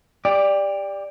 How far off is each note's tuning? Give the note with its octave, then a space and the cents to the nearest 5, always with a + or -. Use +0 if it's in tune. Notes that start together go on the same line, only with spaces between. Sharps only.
G4 +25 D5 +0